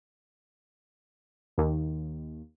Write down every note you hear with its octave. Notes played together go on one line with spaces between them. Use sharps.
D#2